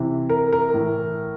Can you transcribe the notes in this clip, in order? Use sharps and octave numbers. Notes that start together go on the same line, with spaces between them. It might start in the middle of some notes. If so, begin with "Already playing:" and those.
Already playing: C3 E3
A#4
A#4
A2 E3